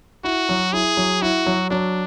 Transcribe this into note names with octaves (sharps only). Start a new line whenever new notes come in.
E4 F#4
F#3
E4 G#4
F#3
E4 F#4
F#3
F#3 D4